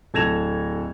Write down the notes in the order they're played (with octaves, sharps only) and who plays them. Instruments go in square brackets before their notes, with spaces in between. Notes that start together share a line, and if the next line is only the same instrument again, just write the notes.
[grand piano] D1 A4 G#6 A#6 E7 F7